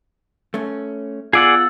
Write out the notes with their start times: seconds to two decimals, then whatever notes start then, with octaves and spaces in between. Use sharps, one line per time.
0.54 A3 C#4
1.33 B3 F4 G#4 D5 F#5 E6 A6